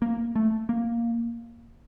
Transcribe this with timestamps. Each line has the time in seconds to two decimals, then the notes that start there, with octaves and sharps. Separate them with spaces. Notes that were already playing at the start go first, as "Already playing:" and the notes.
0.02 A#3
0.36 A3
0.69 A#3